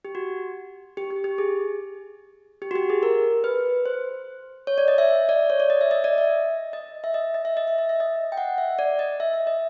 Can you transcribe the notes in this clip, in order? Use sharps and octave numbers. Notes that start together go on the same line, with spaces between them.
G4
F#4
G4
G4
G4
G#4
G4
F#4
G4
G#4
A#4
B4
C5
C#5
D5
D#5
E5
E5
D5
C#5
D5
D#5
E5
D#5
D5
E5
D#5
E5
D#5
D#5
E5
D#5
E5
D#5
E5
D#5
G5
F#5
E5
D5
D#5
E5
E5
D#5